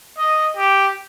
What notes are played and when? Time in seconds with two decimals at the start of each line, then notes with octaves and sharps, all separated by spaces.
0.17 D#5
0.56 G4